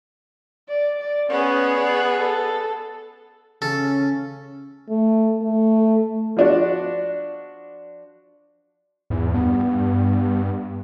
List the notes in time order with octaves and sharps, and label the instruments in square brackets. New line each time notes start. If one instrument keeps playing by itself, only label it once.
[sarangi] D5
D5
[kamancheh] B3 G#4 [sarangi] C#4
[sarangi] D5
A4
[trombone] C#3 [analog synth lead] C#4 [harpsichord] A4
[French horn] A3
A3
[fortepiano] F3 D4 F#4
[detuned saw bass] E2 [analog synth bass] G#2
[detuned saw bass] G2 [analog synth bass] B3